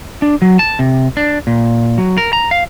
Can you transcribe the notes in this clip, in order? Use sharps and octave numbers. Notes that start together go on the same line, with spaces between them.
D4
F#3
A5
C3
D4
A#2
F#3
A#4
A#5
F5